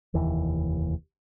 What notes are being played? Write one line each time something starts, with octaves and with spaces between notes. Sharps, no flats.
F1 D#2 E3